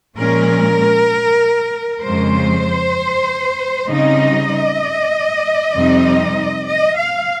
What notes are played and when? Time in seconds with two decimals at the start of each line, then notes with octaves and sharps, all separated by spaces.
0.17 A#2 F3 G#3 C#4 A#4
2.03 F2 C#3 G#3 C5
3.88 C#3 G3 C4 D#4 D#5
5.75 F2 C3 G3 C4 D#4
6.68 D#5
6.98 F5